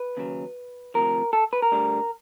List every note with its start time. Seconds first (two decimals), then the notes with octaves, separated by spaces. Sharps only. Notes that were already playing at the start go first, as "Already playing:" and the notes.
Already playing: B4
0.17 D#2 C#3 F#3
0.94 D2 C3 F3 A#4
1.33 A4
1.53 B4
1.62 A#4
1.72 D2 D3 G3